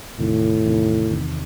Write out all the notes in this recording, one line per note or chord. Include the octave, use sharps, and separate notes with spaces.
E2 A2 C3 D#3
E2 C3 D#3
E2 C3 D#3